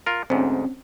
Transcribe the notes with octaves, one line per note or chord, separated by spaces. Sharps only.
F4 A#4
D2 G#2 C4 C#4